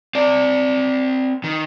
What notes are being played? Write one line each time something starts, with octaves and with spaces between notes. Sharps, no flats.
C4 D5
D#3